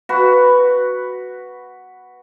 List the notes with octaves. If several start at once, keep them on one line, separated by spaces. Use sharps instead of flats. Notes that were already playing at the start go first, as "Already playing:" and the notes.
F#4 B4